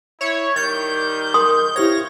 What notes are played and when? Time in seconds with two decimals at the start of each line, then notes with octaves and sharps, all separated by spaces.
0.21 E4 C#5
0.56 D#3 G3 G6 A6
1.34 A#4 C6 D#6
1.76 E4 G4 C5 C#5 F5 A#6